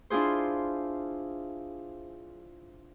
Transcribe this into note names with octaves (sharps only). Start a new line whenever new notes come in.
D4 E4 F4 G#4 C5